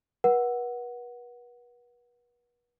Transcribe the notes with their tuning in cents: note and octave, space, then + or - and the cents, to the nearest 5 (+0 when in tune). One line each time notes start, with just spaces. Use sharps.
B4 -40 F#5 +0